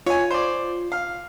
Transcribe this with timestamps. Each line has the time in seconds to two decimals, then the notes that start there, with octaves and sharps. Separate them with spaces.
0.06 F4 C#5 G#5
0.31 C5 D5
0.92 F5